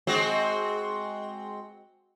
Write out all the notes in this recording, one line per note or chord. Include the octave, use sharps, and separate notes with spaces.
G#3 C4 F#4